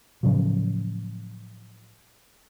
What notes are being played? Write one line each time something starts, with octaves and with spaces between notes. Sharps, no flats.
A2 C#3 F3 F#3